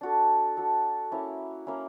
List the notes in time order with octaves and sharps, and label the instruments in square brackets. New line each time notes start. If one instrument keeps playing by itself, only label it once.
[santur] D4 F#4 A4
D4 F#4 A4
A#3 C#4 E4
A#3 C#4 E4